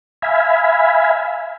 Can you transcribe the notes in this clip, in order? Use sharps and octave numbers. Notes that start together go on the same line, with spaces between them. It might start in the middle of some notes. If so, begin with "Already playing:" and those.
E5 F5 G#5 B5